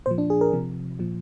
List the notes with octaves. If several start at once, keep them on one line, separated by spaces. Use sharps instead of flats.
A#2 F3 C5
D4
G#4
A#4
C3 F3
A#2 F3